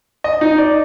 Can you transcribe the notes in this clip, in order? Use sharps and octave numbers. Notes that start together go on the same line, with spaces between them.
D#5
D#4
D5